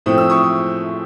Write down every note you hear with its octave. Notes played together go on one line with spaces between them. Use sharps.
A2 F3 A3 C4 D#6
E6
C#6 D#6